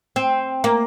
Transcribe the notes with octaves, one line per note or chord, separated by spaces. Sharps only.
C4
A#3